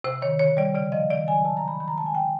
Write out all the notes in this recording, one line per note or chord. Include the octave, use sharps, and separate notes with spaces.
C3 C5
D#3 C#5
D3 C#5
G3 D5
C#3 D5
F3 D#5
D#3 D5
F#3 G#5
C3 A5
A#5
D#3
B5
D#3 B5
A#5
G#3 A5
G#5
D3 G5